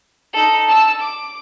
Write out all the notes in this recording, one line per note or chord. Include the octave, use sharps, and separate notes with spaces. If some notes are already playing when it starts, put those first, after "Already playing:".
D#4 A4
A5 E6
D6